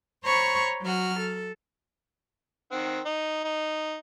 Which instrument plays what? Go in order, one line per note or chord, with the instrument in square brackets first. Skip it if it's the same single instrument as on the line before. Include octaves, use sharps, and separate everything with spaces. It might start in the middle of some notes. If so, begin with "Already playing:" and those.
[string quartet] C5 C#5 A#5 B5 C#6
F#3 F#4 F6
A4
[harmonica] D#3 C4 F#5
D#4
D#4